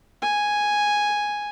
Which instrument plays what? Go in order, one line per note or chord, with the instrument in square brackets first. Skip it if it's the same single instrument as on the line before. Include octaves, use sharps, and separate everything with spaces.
[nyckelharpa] G#5